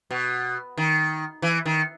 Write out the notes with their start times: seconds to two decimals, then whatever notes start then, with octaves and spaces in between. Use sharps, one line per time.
0.11 B2
0.77 D#3
1.42 E3
1.66 D#3